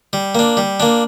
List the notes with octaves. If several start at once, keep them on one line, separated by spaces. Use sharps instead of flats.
G3
A#3 D4
G3
A#3 D4